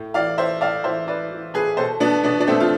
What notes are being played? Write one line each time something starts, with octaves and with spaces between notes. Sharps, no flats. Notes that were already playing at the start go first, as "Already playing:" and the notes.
Already playing: A2
E3 D5 F5
E3 C5 E5
A2 D5 F5
E3 C5 E5
E3 B4 D5
E3
A2 G#4 B4
B2 A4 C5
B2 B3 D4
B2 B3 D4
D4
B2 A3 C4
F4